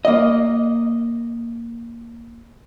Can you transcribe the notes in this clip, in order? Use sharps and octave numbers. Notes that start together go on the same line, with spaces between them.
A#3 D#5